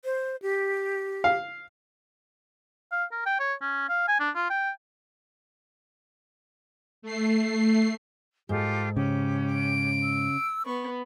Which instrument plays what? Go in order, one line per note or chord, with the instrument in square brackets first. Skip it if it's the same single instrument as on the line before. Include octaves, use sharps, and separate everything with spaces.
[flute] C5
G4
[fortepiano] F5
[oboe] F5
A#4
G5
C#5
C#4
F5
G#5
D4
F4
G5
[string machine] A3 C7
[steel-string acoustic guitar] G#2 [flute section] F4 G4 A4
[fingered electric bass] C#3 [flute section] C#4 G4
[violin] D7
[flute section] E6
[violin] B3 [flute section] C#6